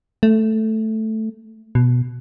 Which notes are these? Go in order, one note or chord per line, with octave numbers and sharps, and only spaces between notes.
A3
B2